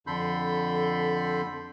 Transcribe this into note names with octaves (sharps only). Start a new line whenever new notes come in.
F2 D3 A4 B5 C6 G6